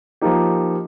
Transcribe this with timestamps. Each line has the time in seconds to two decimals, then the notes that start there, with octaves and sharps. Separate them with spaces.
0.21 F3 A#3 D#4 G4